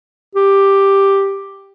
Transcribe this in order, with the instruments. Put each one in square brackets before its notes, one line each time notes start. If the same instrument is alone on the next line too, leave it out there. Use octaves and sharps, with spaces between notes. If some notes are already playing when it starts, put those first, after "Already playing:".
[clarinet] G4